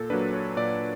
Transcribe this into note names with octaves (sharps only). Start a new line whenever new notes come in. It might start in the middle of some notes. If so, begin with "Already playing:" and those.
Already playing: A#2 A4
F#3 A#3 D4 B4
C#5
A#2 D5